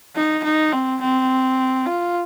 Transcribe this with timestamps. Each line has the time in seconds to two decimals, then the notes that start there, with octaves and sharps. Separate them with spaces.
0.16 D#4
0.44 D#4
0.72 C4
1.01 C4
1.86 F4